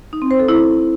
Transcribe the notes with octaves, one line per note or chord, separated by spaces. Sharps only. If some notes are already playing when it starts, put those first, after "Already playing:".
D#4
C4
C5
A4
E4